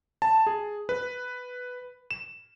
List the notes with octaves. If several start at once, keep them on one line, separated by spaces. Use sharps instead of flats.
A5
G#4
B4
E7